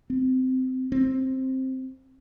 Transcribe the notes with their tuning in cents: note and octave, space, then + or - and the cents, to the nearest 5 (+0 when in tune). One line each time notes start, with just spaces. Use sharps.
C4 -20
C4 +5